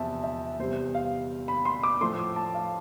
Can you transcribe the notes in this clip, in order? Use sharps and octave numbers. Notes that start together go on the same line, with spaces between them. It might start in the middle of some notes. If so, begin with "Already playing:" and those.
Already playing: E2 C3 F3 E5 A5
E5
E2 C3 G3 C5
F5
B5
C6
D6
A2 F3 A3 C6
D6
A5
F5